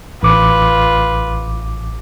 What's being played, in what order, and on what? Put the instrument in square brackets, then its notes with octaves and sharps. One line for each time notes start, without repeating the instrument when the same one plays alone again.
[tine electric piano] A1 D6 [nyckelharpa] F4 B4